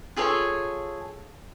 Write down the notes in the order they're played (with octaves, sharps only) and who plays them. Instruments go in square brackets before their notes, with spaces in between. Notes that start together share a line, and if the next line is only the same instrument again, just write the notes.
[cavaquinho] F4 G#4 A4 C#5